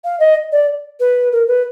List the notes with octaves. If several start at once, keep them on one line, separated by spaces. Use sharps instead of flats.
F5
D#5
D5
B4
A#4
B4